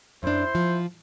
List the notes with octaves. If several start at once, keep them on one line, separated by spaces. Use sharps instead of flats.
F#2 D4 E4 C5 C6
F3